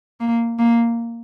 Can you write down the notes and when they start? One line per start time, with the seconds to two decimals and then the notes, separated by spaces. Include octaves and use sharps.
0.20 A#3
0.59 A#3